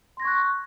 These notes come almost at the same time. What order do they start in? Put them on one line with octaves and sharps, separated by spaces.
C6 A#6 G#6 C#6 F#6